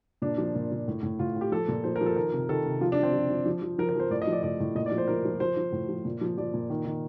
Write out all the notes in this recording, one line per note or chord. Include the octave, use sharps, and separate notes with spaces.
A#2 D4
F3
A#2
A#2
A2
A2
A2 F4
A2
G4
F3 A4
A#2
F3 C5
A#4
F3
A4
D#3 A#4
C3
D#3 A4
C3
F3 F4
D4
F3
C4
F3
F3
F3
F3
F3 A#4
A#4
F3 C5
A2 D5
D#5
F3 D5
A2 D5
A2
A#2 D#5
D5
F3
C5
F3 A#4
F3
F3 C5
F3
A2
F3
A#2
F3
F3 D5
A#2
D#3
D#3